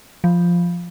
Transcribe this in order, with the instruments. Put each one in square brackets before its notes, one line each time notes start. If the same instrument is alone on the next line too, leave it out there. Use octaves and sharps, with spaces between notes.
[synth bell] F3